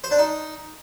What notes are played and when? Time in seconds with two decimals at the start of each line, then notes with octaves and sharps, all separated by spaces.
0.04 C5
0.11 D4
0.19 D#4